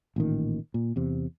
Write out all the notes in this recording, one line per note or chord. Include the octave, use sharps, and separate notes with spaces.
A1 A#2 D#3
A#2
E2 C3